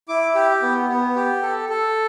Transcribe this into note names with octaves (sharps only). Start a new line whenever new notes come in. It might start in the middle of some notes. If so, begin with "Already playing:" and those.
E4 D6
G4
B3
B3
G4
A4
A4